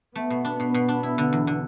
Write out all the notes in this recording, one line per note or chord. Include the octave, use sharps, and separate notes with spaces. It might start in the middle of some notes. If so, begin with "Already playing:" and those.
A3 B3
B2
D4
B2
B2
D4
E4
D3
E2
D3